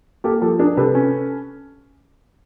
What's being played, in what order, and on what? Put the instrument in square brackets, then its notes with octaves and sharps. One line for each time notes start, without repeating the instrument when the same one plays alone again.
[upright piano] A#3 [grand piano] G4 A4
[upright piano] F3 [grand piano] G4 A4
[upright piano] D4 [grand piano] G#4 A#4
[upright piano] C3 [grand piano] A4 B4
[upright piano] C#4